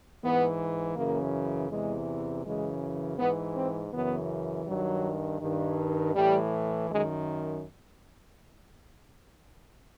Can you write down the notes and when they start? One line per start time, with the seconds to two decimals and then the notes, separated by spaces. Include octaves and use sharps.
0.23 G#2 E3 B3
0.96 F#2 C#3 E3 A#3
1.70 E2 C3 E3 G#3
2.45 F#2 C#3 E3 G#3
3.18 G#2 E3 B3
3.56 C4
3.92 F#2 C#3 E3 B3
4.67 G2 D#3 F#3
5.41 G2 D#3
6.15 A2 E3 G3
6.89 F#2 D#3 G#3